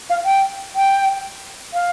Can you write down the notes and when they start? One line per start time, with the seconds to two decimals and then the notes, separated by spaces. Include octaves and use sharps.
0.10 F5
0.25 G5
0.75 G5
1.74 F5